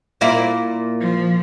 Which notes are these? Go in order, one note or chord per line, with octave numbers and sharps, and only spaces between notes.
A#2 A#3 E4
F3